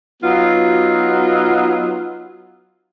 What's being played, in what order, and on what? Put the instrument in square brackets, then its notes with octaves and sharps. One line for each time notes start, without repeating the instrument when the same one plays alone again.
[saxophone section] F#3 B3 D#4 F4 F#4